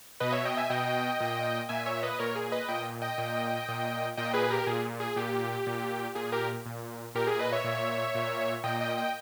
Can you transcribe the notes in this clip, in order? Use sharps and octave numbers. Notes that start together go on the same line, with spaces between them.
B2 B4 D#5
C#5 E5
D#5 G5
E5 G#5
B2 D#5 G5
A#2
A#2 E5 G#5
C#5 E5
B4 D#5
A#2 A#4 C#5
G#4
B4 D#5
A#2 D#5 G5
D#5 G5
A#2
A#2
A#2 D#5 G5
G#4 B4
G4 A#4
A#2 G#4
G#4
A#2 G4
A#2
A#2 G#4
G4 A#4
A#2
A#2 G4 A#4
G#4
B4 D#5
C#5 E5
A#2
A#2
A#2 D#5 G5
D#5 G5
D#5 G5